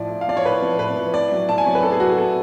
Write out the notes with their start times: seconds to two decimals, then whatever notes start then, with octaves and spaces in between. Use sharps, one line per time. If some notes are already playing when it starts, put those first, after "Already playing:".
Already playing: A2 F3 D5
0.10 A2
0.21 F5
0.28 F3 D5
0.37 C#5
0.45 A2 B4
0.62 F3
0.79 A2 B4
0.96 F3
1.14 A2 D5
1.32 F#3
1.49 A2 A5
1.58 G#5
1.66 F#3 C#5
1.75 B4
1.83 A2 A4
1.92 G#4
2.00 F#3 F#4
2.09 G#4
2.17 A2 A4